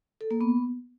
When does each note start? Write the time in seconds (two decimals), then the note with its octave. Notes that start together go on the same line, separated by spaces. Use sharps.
0.21 A4
0.31 A#3
0.41 B3